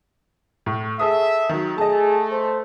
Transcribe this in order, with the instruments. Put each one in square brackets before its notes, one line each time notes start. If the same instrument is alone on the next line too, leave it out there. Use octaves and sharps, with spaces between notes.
[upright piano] A2
[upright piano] G#4 A4 D#6 [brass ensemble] E5
[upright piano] D#3 F#3
[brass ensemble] A3 [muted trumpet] G#4 [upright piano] D#5 A5
[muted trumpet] C5